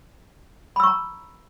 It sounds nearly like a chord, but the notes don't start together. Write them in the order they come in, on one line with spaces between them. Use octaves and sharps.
B5 E6 C#6 A#5